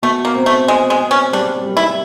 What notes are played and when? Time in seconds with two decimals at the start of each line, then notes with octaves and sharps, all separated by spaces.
0.02 B2 A3
0.25 A#3
0.35 C4
0.46 A3
0.68 G#3 C4
0.90 G#3
1.01 C4
1.11 C#4
1.33 G3 D4
1.66 G3
1.77 E4